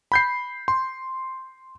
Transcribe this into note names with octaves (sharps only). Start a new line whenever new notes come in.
B5 G6 C7
C6